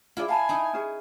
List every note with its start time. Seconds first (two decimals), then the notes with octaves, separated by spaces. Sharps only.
0.17 E4 F4 G#4 D5
0.29 F5 G#5 A5 B5
0.49 D#4 E4
0.73 C#4 G#4